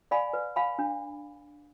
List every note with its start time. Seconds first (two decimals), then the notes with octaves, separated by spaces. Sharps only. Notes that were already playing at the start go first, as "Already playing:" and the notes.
0.11 D5 F5 G#5 B5
0.33 B4
0.56 F5 G#5 B5
0.79 D4